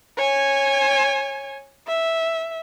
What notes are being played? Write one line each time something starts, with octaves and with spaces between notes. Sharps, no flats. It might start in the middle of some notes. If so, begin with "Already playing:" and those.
C#5 G#5
E5